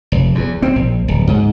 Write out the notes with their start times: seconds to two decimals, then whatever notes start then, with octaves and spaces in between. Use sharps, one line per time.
0.12 F1
0.35 E2
0.63 C4
0.76 A#1
1.08 D1
1.27 G#2